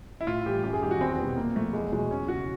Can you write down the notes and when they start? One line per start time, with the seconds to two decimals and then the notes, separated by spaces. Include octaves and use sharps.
0.21 E4
0.27 A2 F4
0.46 E3 G3 G4
0.63 F#2 G4
0.73 G#4
0.82 D#3 G3 G4
0.91 F#4
1.01 E2 C4
1.19 B2 G3 B3
1.37 A#2 A#3
1.56 F3 A3
1.73 E2 G#3
1.92 B2 F#3 G#3
2.10 E2 C#4
2.28 C#3 F#3 F#4